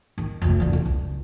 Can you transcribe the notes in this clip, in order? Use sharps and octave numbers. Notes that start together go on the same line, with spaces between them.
D#3
F1 D2
F#2 D3
E1
C#2